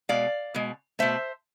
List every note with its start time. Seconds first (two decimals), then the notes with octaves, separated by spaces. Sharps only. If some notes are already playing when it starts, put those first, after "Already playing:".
0.09 B2 G#3 D5 F5
0.54 B2 G#3
0.99 B2 A3 C5 E5